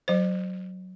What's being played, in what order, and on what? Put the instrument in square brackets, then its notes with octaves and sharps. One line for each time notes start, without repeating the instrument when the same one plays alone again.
[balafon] F#3 C5